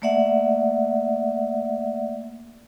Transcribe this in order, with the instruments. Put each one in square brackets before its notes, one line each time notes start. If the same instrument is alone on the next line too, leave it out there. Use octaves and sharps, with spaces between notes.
[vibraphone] A3 A#3 D5 E5 F#5